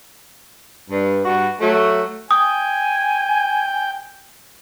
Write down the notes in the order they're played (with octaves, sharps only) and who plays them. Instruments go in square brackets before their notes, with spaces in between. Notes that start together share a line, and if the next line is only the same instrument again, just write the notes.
[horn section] G2
G2 F#4
F#3 A3
[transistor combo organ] G5 [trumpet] G#5 [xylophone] D#6